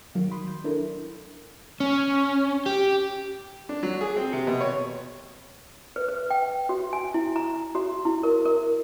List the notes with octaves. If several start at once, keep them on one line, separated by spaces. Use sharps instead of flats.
D#3 F#3 F5 D7
B5 C6 D#6 F#6
G6
D4 E4 A4 A#4
C#4
G4
D4
F#3
G#4
C4
C3
B2
C#5
B4
B4
G5
F#4
G#5
E4
A#5
F#4
E4
A#4
A#4